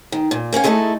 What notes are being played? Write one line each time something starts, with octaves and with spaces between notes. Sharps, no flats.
D#3
A#2
A#3 C#4 G4 F5
G#3 A3 D#4 E4 F#4 A4